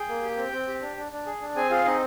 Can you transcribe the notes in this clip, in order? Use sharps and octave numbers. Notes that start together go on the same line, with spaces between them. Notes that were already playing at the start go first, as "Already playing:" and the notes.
Already playing: G#4 G5
A#3
G4
C4
C4
G4
D4
D4
D4
G#4
D4
C4 G#4 G#5
F4 G#4 F5
C4 D#4 D#5